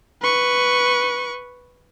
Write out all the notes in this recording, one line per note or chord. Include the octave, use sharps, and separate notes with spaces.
B4 C#6